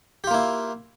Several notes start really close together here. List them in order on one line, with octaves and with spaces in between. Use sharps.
G4 F4 A#3 E4